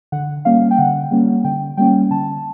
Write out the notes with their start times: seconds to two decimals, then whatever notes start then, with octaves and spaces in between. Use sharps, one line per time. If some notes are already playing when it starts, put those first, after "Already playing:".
0.12 D3 F#5
0.45 G3 A#3 C#4 F5
0.71 G5
0.78 D3 F#5
1.11 G3 A#3 C#4
1.44 D3 G5
1.77 G3 A#3 C#4 G5
2.11 D3 A5